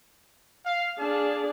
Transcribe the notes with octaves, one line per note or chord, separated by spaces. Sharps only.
F5
D4 G#4 F5 A5